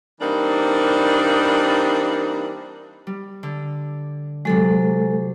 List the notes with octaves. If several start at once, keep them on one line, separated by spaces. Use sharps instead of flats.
E3 G3 A#3 C4 D4 D#4
G3
D3
C3 F#3 G#3 A4